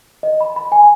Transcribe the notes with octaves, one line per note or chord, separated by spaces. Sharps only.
D#5
B5
B5
G#5